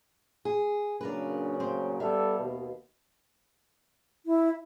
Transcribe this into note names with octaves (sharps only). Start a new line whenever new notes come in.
G#4
A#2 C#3 F#3 D4 A#4 B4
C4
G3 B3 A4 E5 F5
D#2 B2
E4